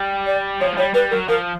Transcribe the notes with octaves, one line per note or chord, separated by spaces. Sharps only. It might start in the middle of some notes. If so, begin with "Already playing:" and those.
Already playing: G3
D5
F3 C#5
G#3
G3 C#5
G3 B4
F#3 A#4
F3 A#4